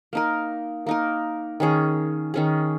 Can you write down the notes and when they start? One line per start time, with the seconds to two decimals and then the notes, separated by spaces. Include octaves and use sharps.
0.13 A#3 D#4 A#4
0.87 A#3 D#4 A#4
1.60 D#3 C#4 G#4
2.34 D#3 C#4 G#4